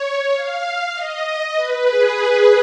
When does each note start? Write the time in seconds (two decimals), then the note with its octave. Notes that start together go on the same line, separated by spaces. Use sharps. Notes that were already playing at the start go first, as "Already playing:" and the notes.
Already playing: C#5
0.32 F5
0.94 D#5
1.55 B4
1.86 G#4